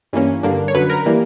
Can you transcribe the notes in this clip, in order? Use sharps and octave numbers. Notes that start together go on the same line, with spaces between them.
G2 E3 A#3 C#4
G2 D3 A#3 D4
C#5
F#2 D3 F#3 B4
A#4
E3 G3 A#3